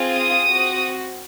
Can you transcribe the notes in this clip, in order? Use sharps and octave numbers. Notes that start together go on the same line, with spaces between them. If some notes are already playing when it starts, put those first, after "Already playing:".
Already playing: C4 F4 G#4
D#6
C4 F#4